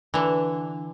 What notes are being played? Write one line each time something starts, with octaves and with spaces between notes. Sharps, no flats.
D3 E3